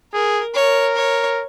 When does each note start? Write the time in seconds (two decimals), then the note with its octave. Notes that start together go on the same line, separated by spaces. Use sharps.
0.13 G#4 A#4
0.55 A#4 C#5
0.96 C#5